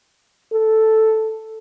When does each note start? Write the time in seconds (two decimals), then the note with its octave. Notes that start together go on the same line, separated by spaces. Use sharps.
0.53 A4